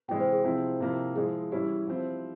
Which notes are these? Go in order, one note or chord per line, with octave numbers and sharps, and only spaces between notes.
C3 E3 G#3 E4 G5
C5
G#4
C3 F3 C4 E4
C3 F3 A#3 E4
F3 G#3 E4 G#4
E3 G3 C#4 E4 G4
F3 C4 E4